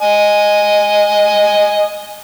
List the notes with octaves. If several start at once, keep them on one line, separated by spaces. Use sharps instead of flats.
D#5 G#5